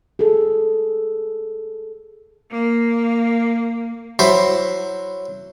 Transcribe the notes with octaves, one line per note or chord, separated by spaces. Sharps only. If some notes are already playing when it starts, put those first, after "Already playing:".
G#4 A4
A#3
F#3 E4 C5 B5